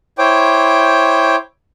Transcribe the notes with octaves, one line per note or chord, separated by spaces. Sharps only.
E4 C5 C#5 G5 D6